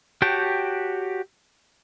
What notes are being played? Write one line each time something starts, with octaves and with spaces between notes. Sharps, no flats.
F#4 G4 C#5 G5 A5